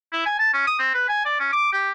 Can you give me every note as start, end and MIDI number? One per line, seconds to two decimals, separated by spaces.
0.12 0.25 64
0.26 0.38 80
0.39 0.49 81
0.54 0.67 61
0.67 0.78 87
0.79 0.93 60
0.94 1.05 71
1.09 1.21 80
1.25 1.39 74
1.40 1.51 61
1.53 1.71 86
1.72 1.92 67